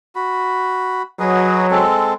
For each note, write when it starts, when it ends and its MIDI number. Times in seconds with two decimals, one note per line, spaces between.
0.15 1.02 66
0.15 1.02 83
1.19 1.82 54
1.19 1.67 68
1.19 1.67 71
1.19 1.67 75
1.71 2.14 56
1.71 2.14 60
1.71 2.14 69